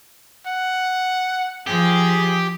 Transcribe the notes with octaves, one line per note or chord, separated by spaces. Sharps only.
F#5
F3 G4 G#4